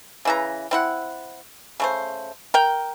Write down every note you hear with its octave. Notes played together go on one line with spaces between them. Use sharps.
C#3 E3 A#5
C4 E4 F#5
C#3 A3 C5
A#4 G5